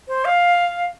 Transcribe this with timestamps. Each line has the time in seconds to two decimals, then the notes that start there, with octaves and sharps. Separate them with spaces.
0.08 C5
0.25 F5